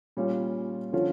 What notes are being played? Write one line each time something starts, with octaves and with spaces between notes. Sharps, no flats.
A#2 G3 C#4 F4
D3 F3 C#4 F4